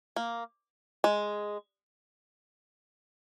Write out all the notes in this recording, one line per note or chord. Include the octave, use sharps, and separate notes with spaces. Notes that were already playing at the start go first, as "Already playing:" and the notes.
A#3
G#3